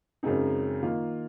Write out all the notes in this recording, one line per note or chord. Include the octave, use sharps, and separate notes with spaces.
F#2 C#3 G#3 C4 D#4
D#3 A#3 F4